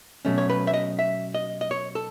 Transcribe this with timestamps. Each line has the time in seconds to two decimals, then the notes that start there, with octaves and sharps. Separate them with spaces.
0.25 B2 F#3 A3 C#4
0.38 C#5
0.50 B4
0.67 E5
0.74 D#5
0.99 E5
1.34 D#5
1.61 D#5
1.71 C#5
1.95 A4